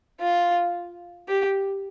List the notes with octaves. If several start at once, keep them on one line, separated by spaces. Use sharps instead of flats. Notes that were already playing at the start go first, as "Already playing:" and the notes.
F4
G4